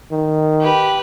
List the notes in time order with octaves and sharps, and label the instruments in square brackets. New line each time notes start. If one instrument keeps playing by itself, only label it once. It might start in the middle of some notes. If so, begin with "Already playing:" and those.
[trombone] D#3
[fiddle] G4 B4